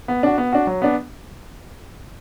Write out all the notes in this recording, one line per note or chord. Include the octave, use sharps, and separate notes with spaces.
B3
D4 F#4
B3
D4 F#4
F#3
B3 D4